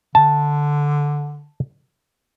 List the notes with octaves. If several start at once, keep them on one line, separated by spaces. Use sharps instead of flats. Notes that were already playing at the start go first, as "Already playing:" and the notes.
D3 A5